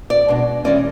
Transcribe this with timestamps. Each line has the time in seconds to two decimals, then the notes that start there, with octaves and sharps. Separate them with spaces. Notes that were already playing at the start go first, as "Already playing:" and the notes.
0.10 D5
0.28 B2 G#3 D4
0.65 E3 G#3 C#4 D5